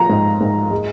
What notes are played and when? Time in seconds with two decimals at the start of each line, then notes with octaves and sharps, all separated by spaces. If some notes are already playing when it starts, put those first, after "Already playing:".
Already playing: F3 A#5
0.09 G#2
0.41 G#2
0.71 G#3